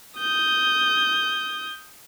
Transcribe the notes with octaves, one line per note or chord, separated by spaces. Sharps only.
D#6 G6